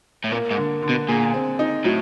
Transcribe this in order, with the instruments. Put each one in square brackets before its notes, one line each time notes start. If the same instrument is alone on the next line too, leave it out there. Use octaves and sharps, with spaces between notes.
[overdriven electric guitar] A2
[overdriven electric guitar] A#2 [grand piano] A#3
[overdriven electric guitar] G#2
[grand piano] D3
D3
[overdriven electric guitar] B2
[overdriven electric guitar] A#2 [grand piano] G#4
[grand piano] C4
D#4
[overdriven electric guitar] A2 [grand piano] F#3